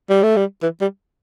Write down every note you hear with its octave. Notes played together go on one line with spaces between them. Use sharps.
G3
A3
G3
E3
G3